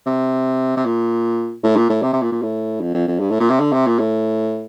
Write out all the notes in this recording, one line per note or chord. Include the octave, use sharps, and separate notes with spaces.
C3
C3
A#2
A2
A#2
A2
C3
C3
A#2
A#2
A2
F2
F2
F2
G2
A2
A#2
C3
D3
C3
A#2
A2